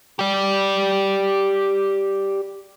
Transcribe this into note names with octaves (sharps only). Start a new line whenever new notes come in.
G4 D5